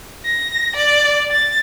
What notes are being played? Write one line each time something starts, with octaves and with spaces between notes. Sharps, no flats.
A#6
D5
A6